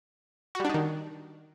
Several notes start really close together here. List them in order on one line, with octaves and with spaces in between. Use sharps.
F#4 G3 D4 D#4 D#3